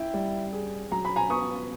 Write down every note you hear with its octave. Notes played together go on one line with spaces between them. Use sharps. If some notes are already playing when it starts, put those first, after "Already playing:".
Already playing: E4 G5
G3
G#4
F#3 A#5
B5
G#5 A#5
B3 C#6 D#6